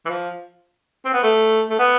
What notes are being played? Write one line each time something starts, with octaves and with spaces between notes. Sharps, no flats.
E3
F3
C4
B3
A3
A3
B3